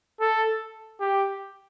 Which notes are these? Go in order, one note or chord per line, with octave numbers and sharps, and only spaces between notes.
A4
G4